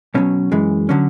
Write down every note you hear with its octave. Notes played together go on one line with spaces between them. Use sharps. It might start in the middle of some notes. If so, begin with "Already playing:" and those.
B1 B2 F#3 C#4
F#2 E3 G#3
D3 F#3 C#4